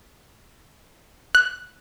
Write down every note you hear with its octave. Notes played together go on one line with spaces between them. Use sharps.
F#6